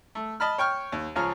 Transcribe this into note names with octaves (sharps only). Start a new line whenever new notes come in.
A3
D#5 A5 B5 F6
C#5 G5 C#6 F6
D#2
C#2 F3 C#4 G#4 A#5 F6